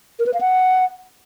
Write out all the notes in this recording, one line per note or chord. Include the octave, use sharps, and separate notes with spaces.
A#4
B4
F5
F#5